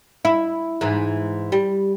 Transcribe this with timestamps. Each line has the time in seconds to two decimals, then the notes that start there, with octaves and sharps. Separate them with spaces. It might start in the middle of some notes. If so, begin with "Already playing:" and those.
0.25 E4
0.81 G#2 E3
1.52 G3